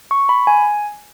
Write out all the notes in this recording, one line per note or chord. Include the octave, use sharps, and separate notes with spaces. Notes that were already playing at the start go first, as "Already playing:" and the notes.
C#6
B5
G#5